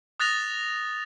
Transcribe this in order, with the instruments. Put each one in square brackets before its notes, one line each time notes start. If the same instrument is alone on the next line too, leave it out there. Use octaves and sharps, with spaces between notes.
[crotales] D#6 F#6 A6 A#6 F7